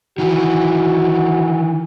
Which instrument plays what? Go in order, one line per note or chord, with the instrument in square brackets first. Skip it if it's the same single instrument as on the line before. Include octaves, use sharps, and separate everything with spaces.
[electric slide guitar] D#3 E3 [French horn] F#4